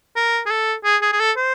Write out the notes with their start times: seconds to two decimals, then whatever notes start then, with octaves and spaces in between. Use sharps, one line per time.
0.16 A#4
0.46 G#4
0.50 A4
0.84 G#4
1.02 G#4
1.12 G#4
1.20 A4
1.37 C5